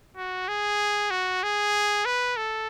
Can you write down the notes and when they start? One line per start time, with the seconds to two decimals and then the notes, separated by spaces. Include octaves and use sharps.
0.17 F#4
0.48 G#4
1.11 F#4
1.43 G#4
2.05 B4
2.37 A4